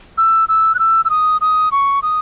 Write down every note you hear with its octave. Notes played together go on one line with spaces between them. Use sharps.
E6
E6
F#6
E6
E6
D#6
D#6
C#6
D#6